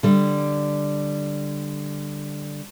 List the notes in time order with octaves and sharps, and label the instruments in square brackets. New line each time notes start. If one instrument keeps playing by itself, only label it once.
[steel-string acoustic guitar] D3 G3